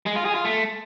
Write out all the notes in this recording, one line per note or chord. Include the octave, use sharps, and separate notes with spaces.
G#3
F4
G#4
F4
A3